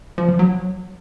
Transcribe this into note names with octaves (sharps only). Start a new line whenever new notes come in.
F3
F3
F#3